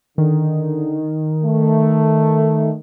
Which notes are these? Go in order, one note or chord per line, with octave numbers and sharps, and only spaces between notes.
D3 D#3
A3